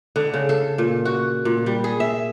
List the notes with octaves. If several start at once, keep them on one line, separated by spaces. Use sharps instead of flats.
D3
C#3
A4
A#2
F#4
A#2
G3
G#4
E5